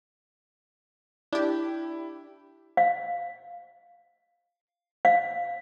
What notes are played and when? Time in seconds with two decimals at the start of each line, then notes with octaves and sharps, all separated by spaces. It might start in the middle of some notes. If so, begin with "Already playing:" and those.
1.33 D4 E4 G4
2.77 F5
5.05 F5